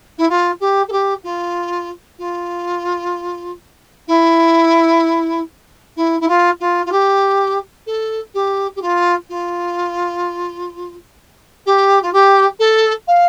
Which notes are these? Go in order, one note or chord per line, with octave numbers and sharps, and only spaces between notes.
E4
F4
G4
A4
G4
F4
F4
E4
E4
E4
F4
F4
F4
G4
A4
G4
G4
F4
F4
G4
F4
G4
A4
F5